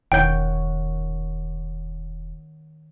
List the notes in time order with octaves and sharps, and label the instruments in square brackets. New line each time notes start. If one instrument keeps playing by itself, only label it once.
[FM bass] E1 [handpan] D#3 C#5 F#5 [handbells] G5 G6